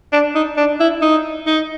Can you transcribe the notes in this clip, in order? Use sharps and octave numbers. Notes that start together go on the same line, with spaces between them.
D4
D#4
D4
E4
D#4
D#4